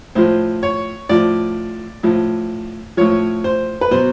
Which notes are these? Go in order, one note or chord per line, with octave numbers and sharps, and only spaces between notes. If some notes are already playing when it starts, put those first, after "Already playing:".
A2 F3 C5
C#5
A2 F3 D5
A2 F3
A2 F3 C#5
C5
B4
B2 F#3 C5